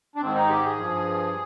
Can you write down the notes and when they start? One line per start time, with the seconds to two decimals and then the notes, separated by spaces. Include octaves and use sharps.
0.16 D4
0.21 G#2 D#3 C4
0.35 D#4
0.50 G4
0.64 G#4
0.78 G2 F3